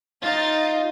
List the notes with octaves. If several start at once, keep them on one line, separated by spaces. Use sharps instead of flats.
D#4 F4 F5 A6